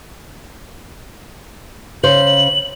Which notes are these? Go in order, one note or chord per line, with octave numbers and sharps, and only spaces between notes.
C#3 C5 F#7